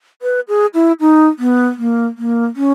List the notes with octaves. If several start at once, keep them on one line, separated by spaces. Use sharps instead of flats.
B4
G#4
E4
D#4
B3
A#3
A#3
C#4